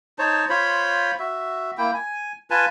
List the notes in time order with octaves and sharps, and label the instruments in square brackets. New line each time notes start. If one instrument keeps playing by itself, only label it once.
[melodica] D#4 C5 C#5 A5
F4 C5 C#5 B5
F#4 E5
A#3 E4 G5
G#5
F4 B4 G#5 A5